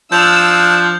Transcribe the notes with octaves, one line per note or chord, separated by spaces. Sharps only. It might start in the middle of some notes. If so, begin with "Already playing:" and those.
F3 D4 F5 E6 G6 F7